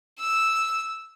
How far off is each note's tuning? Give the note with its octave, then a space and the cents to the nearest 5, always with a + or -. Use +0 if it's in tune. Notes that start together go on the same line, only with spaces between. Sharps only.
E6 -5